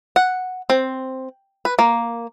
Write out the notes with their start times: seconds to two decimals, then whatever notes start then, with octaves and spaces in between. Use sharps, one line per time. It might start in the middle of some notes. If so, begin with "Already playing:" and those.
0.16 F#5
0.70 C4
1.65 B4
1.79 A#3